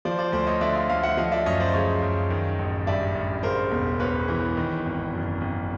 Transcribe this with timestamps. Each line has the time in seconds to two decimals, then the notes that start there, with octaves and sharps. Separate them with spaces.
0.05 F3 C5 D5
0.19 C5 D5
0.32 D2 C5 D5
0.47 C#5 D#5
0.61 D3 D5 E5
0.75 D#5 F5
0.90 D2 D#5 F5
1.03 E5 F#5
1.17 F3 D#5 F5
1.32 D5 E5
1.46 F#2 C#5 D#5
1.60 C5 D5
1.74 C#3 C#5 D#5
2.02 F#2
2.30 D#3
2.59 A1
2.87 G2 D5 E5
3.15 A1
3.43 C#3 A#4 C5
3.72 E1
4.00 E2 B4 C#5
4.28 E3
4.57 D#3
4.85 G#1
5.13 F#2
5.41 G#1